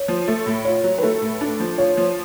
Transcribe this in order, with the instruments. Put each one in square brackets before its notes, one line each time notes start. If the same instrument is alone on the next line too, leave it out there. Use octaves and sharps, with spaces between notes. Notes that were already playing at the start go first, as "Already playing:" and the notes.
Already playing: [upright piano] C#5
[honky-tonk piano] F3
A3
A2
[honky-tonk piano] F4 [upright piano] C#5
[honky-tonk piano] F#3
[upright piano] B4
[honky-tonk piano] A3 [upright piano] A4
[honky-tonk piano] A2
D4
F3
[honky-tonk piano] F4 [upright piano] C#5
[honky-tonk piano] F3